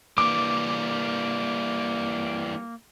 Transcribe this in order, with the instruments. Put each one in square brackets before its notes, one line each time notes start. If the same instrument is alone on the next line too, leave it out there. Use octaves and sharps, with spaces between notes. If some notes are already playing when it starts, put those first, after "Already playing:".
[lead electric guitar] E3 G3 [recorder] A#3 [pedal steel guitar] D6